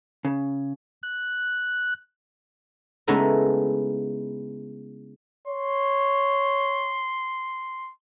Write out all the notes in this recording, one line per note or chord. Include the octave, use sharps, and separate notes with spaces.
C#3
F#6
C#3 G#3 A3 B3 D#4 E4
C#5 C6